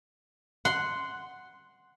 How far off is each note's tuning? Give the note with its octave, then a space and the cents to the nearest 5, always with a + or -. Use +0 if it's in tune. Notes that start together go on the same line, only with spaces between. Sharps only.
F#5 +0 C6 -10